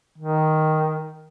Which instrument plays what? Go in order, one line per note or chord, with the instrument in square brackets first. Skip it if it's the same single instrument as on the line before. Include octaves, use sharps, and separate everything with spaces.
[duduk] D#3